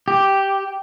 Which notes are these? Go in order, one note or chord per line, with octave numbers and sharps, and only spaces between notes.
G4